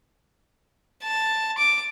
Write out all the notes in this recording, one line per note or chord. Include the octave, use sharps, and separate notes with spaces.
A5
D6